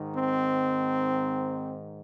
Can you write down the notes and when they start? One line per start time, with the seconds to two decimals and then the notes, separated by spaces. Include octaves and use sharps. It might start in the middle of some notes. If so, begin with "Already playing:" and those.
Already playing: G#2 D#3
0.14 C4